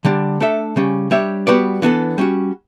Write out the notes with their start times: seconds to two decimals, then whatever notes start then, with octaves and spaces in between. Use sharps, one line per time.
0.05 D3 G3 D4
0.40 A3 D4 A4 E5
0.76 C#3 G3 C#4
1.11 G3 D4 G4 C#5 E5
1.47 G3 B3 F#4 B4 D5
1.82 E3 B3 D4 A4
2.18 G3 C#4 F#4